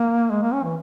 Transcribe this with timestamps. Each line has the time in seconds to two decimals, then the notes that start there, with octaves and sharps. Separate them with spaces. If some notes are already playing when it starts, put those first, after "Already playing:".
Already playing: A#3
0.31 G#3
0.42 A#3
0.53 C#4
0.64 E3